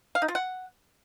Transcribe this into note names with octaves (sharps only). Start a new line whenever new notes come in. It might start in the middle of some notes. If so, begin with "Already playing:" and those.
F5
D#4
F4
F#5